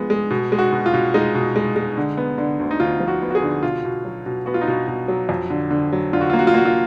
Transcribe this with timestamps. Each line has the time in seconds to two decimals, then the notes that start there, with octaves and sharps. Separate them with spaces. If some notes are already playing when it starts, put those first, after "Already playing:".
Already playing: F3 G#3 B3
0.10 G#3
0.30 B2
0.52 G#3
0.58 F#4
0.72 B2
0.86 F4
0.94 B2
1.14 G#3 D#4
1.35 B2
1.56 G#3
1.76 G#3
1.97 D3
2.17 B3
2.38 D3
2.60 D2
2.71 D#4
2.80 D2 F4
3.00 F3
3.08 F#4
3.22 B3
3.30 F#4
3.35 G#4
3.42 D3
3.63 B2 F4
3.85 B2
4.05 F#3
4.26 B2
4.46 B3 F#4
4.54 F4
4.61 D#4
4.68 B2 F4
4.88 B2
5.08 F#3
5.29 F2
5.50 D3
5.71 D3
5.92 F#3
6.13 D3 F4
6.21 F#4
6.30 A#3 F4
6.39 F#4
6.47 F4
6.54 A#3 F#4
6.65 F4